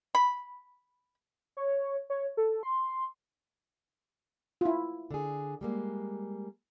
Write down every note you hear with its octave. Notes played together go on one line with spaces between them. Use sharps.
B5
C#5
C#5
A4
C6
E4 F4
D3 G#4
G3 G#3 A#3